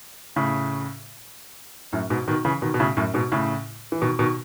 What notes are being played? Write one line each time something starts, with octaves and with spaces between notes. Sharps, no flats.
A2 C#3
F#2 A2
G#2 B2
B2 D#3
C#3 E3
B2 D#3
B2
A2 C#3
F#2 A2
G#2 B2
A2 C#3
E3
B2 D#3
B2 D#3